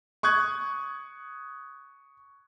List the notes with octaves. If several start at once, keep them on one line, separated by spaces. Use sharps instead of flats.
C#6 D#6 F#6 G#6